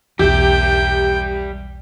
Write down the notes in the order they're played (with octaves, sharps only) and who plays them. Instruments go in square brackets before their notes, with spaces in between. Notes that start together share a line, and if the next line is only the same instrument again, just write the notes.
[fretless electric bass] B1 E2 [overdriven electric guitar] G3 E5 [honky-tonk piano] G4 [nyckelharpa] G5